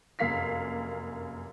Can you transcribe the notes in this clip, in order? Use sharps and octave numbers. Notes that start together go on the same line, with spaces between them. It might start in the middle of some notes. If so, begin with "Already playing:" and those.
F1 F#2 A#3 F5 B6 C7